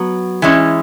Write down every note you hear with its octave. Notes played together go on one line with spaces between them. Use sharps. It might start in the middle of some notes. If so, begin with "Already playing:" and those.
Already playing: F#3 B3
E3 G#3 C#4